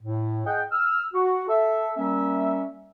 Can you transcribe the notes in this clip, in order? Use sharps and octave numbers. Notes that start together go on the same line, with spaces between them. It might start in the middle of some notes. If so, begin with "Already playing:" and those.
A2
G#4 D#5 F#5 G5
E6 F6
F#4
A4 E5
G3 A#3 C#4 A#4 E5